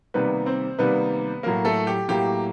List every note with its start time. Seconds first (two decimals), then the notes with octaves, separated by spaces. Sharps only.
0.14 C3 D#3 G3 A#3 B3 B4
0.46 C4 C5
0.79 C3 D#3 G3 A#3 B3 B4
1.43 A2 F#3 A#3 A#4
1.65 A3 A4
1.87 G4
2.08 A2 F#3 A#3 G4